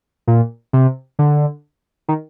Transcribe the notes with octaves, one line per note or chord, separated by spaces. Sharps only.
A#2
C3
D3
D#3